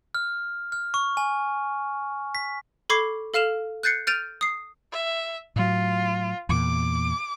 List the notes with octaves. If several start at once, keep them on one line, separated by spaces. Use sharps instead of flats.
F6
F6
C#6
G#5
B6
A4 B5 C#6 D6 G#6 C7
A4 F5 F6 E7 F7
F#6 G6 A6 C7 C#7
F6 G6 A6 D7 D#7 F7
D#6 C7
E5
A2 F#3 F4
E2 A#2 D6